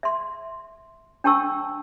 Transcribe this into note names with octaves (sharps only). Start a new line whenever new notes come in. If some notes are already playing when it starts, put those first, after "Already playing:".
E5 C6
D4 G5 A5 C#6 E6